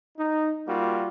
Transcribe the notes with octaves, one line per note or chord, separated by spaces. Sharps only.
D#4
G3 A#3 F4 F#4